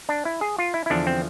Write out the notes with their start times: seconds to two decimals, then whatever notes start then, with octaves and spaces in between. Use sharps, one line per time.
0.09 D4
0.25 E4
0.41 G#4
0.59 F4
0.74 E4
0.86 E4
0.90 E2 D3 F3 D4
1.07 C4